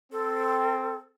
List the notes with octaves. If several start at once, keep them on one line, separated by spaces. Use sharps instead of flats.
C4 A4